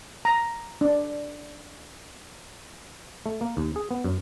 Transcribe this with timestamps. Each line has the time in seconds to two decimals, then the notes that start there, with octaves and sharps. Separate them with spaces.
0.25 A#5
0.81 D4
3.26 A3
3.41 A#3
3.57 D#2
3.76 G#4
3.91 B3
4.04 F#2